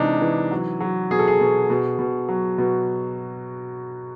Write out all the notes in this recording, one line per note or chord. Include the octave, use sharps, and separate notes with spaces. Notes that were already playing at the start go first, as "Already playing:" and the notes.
Already playing: C3 E3 G#3 D4 D#4
E3
F#3
F#3
B2 G#4
A4
G#4
B2
B2
B2
F#3
B2